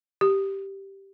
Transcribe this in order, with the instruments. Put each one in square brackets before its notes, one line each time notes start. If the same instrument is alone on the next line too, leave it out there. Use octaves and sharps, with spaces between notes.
[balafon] G4